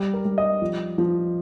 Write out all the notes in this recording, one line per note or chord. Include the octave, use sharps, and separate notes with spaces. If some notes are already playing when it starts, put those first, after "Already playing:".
Already playing: G3
A#4
G3
D#5
F3
F3